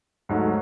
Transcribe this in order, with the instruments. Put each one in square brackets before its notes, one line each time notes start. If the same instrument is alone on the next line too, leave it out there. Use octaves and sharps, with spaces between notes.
[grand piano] G#2 F#3 A3